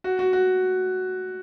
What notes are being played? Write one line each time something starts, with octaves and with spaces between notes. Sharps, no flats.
F#4
F#4
F#4